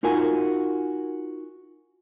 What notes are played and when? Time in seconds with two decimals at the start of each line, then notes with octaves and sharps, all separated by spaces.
0.03 D#4 F4 F#4 A#4 G#5